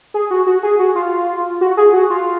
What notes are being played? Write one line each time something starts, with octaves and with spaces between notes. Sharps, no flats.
G#4
F#4
F#4
G#4
F#4
F4
F#4
G#4
F#4
F4